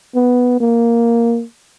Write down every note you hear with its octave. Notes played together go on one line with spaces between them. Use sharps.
B3
A#3